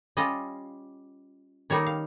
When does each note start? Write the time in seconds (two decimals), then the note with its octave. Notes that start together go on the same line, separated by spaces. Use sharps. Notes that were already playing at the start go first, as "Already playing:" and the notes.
0.17 G3 C#4 F4 D#5
1.70 D#3 G3 A#3 D#4 C#5
1.86 F5